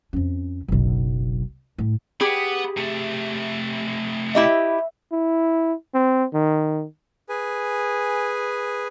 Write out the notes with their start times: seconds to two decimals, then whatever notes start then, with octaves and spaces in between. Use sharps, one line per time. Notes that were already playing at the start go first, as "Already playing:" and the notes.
0.13 F2 C#4
0.68 F#1 B1
1.78 A2
2.21 G4 G#4 F#5 B5
2.77 C3 A3
4.35 E4 G4 D#5 E5
5.13 E4
5.94 C4
6.34 D#3
7.29 G#4 B4 G#5